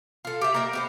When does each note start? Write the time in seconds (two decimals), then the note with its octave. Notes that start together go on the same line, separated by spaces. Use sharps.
0.25 F4 A4
0.41 G4 E5
0.54 A#3 G4 D#5 E5
0.73 B3 G4 C5